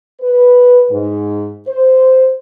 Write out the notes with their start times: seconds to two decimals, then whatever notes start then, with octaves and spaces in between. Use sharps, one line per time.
0.22 B4
0.91 G#2
1.68 C5